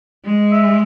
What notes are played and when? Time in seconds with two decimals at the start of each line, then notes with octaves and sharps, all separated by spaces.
0.25 G#3
0.52 E5